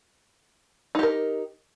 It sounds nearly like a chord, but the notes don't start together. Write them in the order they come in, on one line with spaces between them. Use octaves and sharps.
D#4 G4 A#4